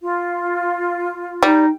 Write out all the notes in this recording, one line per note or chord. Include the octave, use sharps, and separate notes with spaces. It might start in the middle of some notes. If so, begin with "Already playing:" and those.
F4
G3 D#4